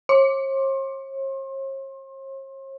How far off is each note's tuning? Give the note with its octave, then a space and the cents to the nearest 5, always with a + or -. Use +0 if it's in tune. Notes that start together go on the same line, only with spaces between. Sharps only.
C#5 -45 C6 +35